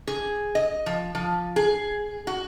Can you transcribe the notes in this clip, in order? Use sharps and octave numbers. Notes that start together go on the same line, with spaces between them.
G#4
D#5
F3
F3
G#4
F#4